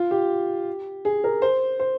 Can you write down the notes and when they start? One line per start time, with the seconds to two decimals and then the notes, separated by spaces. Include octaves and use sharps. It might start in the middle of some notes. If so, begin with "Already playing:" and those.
Already playing: F4
0.11 G4
1.05 G#4
1.24 A#4
1.42 C5
1.80 C5